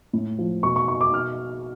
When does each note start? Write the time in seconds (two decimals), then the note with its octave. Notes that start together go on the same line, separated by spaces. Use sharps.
0.13 A2
0.39 F3
0.63 B2 C#6
0.76 C#6
0.88 C#6
1.01 D6
1.13 B2 F6